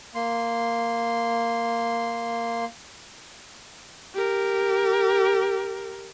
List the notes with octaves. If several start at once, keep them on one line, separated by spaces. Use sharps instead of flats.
A#3 C6
G4 A#4